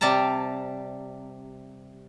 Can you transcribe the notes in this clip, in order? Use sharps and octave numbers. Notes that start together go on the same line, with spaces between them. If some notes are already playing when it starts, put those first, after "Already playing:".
C3 G3 D5 A5 A#5